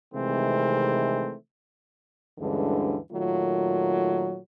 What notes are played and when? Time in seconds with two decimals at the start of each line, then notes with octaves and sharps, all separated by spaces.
0.14 C3 D#3 E3 G#3 A3 C4
2.38 D2 G2 D3 E3 G#3 C#4
3.13 A#2 D#3 F#3 A3 F4